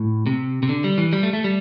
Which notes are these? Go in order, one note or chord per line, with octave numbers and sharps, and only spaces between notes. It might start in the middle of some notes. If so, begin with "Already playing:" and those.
Already playing: A2
C3
C3
D3
G3
E3
G3
A3
A3
G3